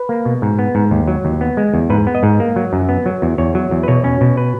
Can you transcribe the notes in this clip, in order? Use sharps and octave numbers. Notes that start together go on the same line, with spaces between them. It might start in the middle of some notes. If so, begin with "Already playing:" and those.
Already playing: B4
A#3
B2
G#2
B3
G#2
D#2
F#3
D#2
B3
G#3
E2
G#2 B4
B3
D#5
G#2
A#3
F#3
F#2
B3
F#3
E2
E2 C#5
F#3
E2
B4
B2 C#5
C#4
B2
B4